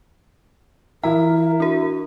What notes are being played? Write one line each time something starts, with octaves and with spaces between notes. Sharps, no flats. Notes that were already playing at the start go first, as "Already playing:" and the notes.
E3 E4 A#4 A#5
D4 F#4 A#4